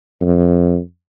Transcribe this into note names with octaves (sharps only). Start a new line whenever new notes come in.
F2